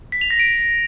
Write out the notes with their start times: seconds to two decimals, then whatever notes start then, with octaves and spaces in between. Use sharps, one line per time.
0.12 B6
0.21 F7
0.30 A#6
0.39 D7